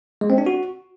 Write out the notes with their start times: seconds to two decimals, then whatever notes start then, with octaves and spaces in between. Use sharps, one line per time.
0.21 G#3
0.30 C4
0.38 D4
0.46 F#4